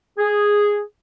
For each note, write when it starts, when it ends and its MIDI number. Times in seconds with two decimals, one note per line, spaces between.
0.18 0.80 68